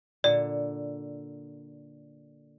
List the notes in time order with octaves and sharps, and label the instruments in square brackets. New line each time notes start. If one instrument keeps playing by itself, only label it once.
[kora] A#2 D3 [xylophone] D5